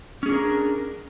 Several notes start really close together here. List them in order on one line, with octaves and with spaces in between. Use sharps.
C#4 G#4 D4 A#4